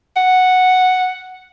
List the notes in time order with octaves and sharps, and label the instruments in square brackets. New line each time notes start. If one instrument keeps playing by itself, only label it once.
[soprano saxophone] F#5